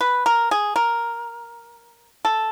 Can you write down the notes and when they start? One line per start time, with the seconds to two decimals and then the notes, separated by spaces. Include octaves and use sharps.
0.01 B4
0.26 A#4
0.51 G#4
0.76 A#4
2.25 A4